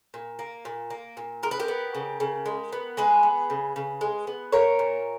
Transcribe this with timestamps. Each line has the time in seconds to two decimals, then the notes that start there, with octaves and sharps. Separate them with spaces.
0.14 A#2
0.39 A#3
0.65 A#2
0.90 A#3
1.17 A#2
1.43 G#3 A#4
1.51 B4
1.60 G4 A#4
1.68 B3
1.95 C#3
2.20 C#3
2.46 G#3
2.73 B3
2.97 G#3 G#4 B4
3.23 B3
3.50 C#3
3.76 C#3
4.01 G#3
4.27 B3
4.52 A#3 A#4 C#5
4.79 A#2